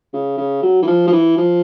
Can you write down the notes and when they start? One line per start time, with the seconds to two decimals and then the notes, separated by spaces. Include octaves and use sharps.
0.13 C#3
0.38 C#3
0.63 F#3
0.82 E3
0.87 F3
1.08 F3
1.12 E3
1.37 F3